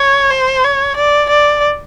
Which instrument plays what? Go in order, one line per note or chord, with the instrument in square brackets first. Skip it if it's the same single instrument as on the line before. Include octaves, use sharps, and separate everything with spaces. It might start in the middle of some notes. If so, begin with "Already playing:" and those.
Already playing: [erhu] C#5
C5
C#5
D5
D5